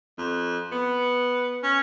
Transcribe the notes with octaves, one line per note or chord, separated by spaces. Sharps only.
F2
B3
C#4